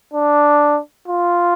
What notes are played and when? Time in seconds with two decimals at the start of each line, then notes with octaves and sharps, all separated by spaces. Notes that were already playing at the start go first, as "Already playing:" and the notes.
0.14 D4
1.08 F4